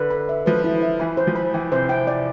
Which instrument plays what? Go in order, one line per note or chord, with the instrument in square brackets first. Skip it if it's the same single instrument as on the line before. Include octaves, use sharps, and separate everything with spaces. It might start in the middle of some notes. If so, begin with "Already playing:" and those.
Already playing: [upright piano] D3 [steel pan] B4
[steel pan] B5
E5
[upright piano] F3 [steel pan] B4
[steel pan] E4
E5
[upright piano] E3 [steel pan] B5
[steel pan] C5
[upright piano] F3
[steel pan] B5
[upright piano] E3 [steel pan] G5
[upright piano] C3 [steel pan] C5
[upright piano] C3 [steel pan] G5
[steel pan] D5